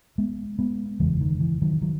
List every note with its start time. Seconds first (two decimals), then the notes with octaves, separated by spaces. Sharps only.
0.18 G#3 B3
0.59 G#3 B3
1.00 F#1 E2 C#3 E3 G#3
1.21 D#3
1.40 E3
1.62 D#3 F#3
1.82 D#3 F#3